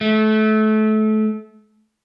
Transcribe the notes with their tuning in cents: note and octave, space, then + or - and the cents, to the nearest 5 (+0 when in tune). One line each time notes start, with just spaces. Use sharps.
A3 -25